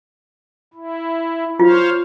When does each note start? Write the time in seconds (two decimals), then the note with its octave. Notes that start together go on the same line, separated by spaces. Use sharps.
0.74 E4
1.60 F4 C5 C#5 F5